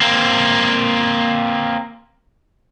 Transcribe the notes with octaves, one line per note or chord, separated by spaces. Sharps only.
A#3 C4